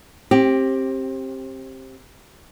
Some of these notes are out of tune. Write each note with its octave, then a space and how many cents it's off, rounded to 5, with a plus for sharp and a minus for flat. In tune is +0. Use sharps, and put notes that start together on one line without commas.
C4 +25 G4 +0